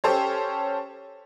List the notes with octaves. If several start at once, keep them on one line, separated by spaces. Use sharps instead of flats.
C#4 G4 A4 C5 C#5